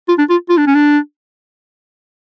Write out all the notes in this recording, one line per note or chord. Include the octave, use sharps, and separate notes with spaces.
F4
D4
F4
F4
D4
C#4
D4